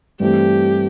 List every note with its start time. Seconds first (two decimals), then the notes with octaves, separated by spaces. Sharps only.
0.20 G2 E3 A3 C4 G4